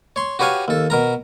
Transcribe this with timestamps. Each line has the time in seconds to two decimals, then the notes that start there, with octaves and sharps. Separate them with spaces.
0.16 C#5 C6
0.39 F#4 G4 B4 C#5 F5 G#5
0.68 D#2 A4
0.90 B2 A#4 A#5